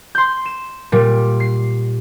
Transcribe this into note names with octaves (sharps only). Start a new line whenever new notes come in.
C6 G6
E7
A#2 G3
C7